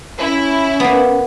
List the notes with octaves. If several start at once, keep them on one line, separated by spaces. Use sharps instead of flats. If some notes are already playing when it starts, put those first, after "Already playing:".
C#4 E4
A#3 B3